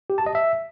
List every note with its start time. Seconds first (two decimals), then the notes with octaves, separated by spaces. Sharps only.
0.10 G4
0.18 A5
0.26 D#5
0.35 E5